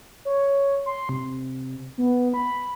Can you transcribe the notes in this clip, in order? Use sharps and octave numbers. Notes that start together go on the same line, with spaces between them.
C#5
C6
C3
B3
B5